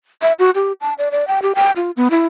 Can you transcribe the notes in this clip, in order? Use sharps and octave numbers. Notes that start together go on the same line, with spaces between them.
E5
F#4
G4
A5
D5
D5
G5
G4
G5
F4
B3
E4